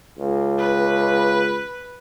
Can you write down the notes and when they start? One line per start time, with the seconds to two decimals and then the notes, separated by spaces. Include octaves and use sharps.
0.18 C#2
0.58 B4